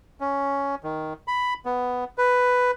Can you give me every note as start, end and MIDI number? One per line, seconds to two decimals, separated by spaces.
0.20 0.75 61
0.84 1.13 51
1.28 1.54 83
1.65 2.04 59
2.18 2.71 71